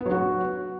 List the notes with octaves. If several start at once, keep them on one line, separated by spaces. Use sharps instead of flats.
B3
F#3
F#4